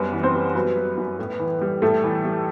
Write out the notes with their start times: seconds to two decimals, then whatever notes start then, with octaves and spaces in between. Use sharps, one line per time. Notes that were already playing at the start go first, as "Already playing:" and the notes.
Already playing: F#2 G3 B3 B4
0.13 E3
0.23 C4 C5
0.34 G3
0.55 F#3 B3 B4
0.77 F#3
0.97 F#2
1.19 A2
1.39 E3
1.61 G3
1.82 A2 A3 A4
2.04 E3
2.25 G3